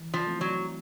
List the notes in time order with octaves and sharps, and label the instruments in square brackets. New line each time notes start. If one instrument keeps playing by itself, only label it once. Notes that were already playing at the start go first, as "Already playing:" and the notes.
Already playing: [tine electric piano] E3
[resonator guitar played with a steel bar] F3
[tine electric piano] A3 C4 E4
[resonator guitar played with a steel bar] F#3